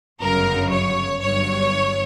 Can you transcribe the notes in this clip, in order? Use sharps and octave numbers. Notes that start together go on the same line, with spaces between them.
G1 F#2 C#3 A#4
C#5
G1 G2 F#3 C#5